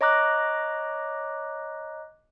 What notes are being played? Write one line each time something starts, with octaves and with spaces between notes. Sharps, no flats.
C#5 D#5 A#5 D6 F#6